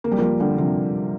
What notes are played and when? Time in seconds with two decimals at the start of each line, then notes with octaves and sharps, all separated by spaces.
0.04 A#3
0.11 G3
0.18 F3 A#3
0.40 D3 G3
0.58 C3 F3